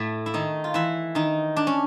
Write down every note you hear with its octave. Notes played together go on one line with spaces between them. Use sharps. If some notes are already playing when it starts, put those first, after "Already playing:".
Already playing: A2 A3
E4
D#3 D#4
F4
E3 E4
D#3 D#4
D4
C#4